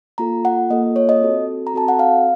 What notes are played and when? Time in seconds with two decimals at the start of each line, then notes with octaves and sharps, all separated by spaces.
0.18 A#3 F4 A4 A#5
0.45 F#5
0.70 A#3 F4 A4 D#5
0.96 C#5
1.09 D#5
1.22 C4 F#4 A4
1.67 A#5
1.74 C4 F#4 A4 A5
1.88 F#5
1.99 F5